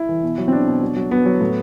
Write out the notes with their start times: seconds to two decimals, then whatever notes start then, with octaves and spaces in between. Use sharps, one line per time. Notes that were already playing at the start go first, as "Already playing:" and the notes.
Already playing: E4
0.09 E3
0.23 B2
0.38 F#3
0.48 C4
0.52 B2 D4
0.67 B2
0.82 F#3
0.96 F#3
1.11 F#3 B3
1.26 F#3
1.41 A2